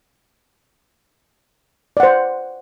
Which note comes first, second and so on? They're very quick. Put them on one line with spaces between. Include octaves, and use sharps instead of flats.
D5 F#5 C5